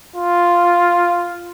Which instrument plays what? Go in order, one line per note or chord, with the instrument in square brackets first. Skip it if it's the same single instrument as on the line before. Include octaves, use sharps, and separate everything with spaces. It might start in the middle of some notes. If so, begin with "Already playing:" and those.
[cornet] F4